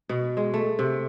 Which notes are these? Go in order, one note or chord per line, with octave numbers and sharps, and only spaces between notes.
B2
G#3
A3
C3